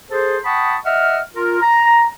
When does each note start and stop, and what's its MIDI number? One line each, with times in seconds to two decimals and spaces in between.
0.11 0.38 68
0.11 0.38 69
0.11 0.38 72
0.45 0.76 78
0.45 0.76 79
0.45 0.76 81
0.45 0.76 83
0.45 0.76 85
0.45 0.76 87
0.85 1.20 75
0.85 1.20 76
0.85 1.20 78
0.85 1.20 89
1.35 1.59 65
1.35 1.59 70
1.62 2.07 82